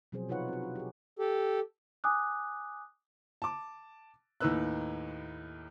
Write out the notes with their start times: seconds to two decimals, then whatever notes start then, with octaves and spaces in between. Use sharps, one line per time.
0.12 B2 F3 F#3 C4 G#4 C5
0.29 C3 D#4 F4 B4 C#5 F#5
0.48 C4 F#4
0.63 E4
0.76 G4 G#4
1.19 G4 A4
2.04 G#5 D6 D#6 F#6
3.42 A5 D6
4.41 D#2 A2 D#4 B4 E6 F#6